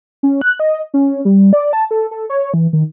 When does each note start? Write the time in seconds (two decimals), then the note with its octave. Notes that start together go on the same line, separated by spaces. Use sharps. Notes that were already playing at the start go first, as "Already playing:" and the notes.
0.23 C#4
0.42 F#6
0.60 D#5
0.94 C#4
1.25 G3
1.53 D5
1.73 A5
1.91 A4
2.11 A4
2.30 C#5
2.54 E3
2.73 D#3